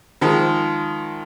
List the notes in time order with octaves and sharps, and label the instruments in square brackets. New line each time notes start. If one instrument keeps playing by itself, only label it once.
[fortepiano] D#3 F3 G#3